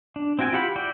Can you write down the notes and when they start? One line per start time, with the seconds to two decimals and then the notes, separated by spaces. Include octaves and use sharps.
0.16 D4
0.39 C4 E4 F#4 G5 G#5
0.53 E4 F4 G4 F#5 B5
0.76 E4 F#4 D5 G5